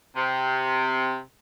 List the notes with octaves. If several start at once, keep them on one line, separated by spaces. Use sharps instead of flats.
C3